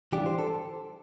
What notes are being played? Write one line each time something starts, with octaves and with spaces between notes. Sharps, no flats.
E3 G3 D4 F4 G4
C5
A4